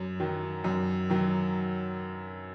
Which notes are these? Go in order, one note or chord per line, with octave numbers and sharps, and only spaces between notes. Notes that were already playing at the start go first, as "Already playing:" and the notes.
Already playing: F#2
D#3 F#3
F#2
D#3 F#3